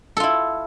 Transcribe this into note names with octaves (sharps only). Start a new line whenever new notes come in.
E4 F4 A4